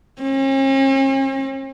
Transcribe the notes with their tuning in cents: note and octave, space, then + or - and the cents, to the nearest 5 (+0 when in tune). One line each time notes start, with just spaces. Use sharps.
C#4 -45